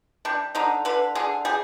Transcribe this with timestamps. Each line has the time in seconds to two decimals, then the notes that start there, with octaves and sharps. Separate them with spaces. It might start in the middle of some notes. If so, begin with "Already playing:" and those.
0.25 G3 D4
0.55 D3 D#4
0.85 D3 B4
1.15 D3 G#4
1.45 G3 G#4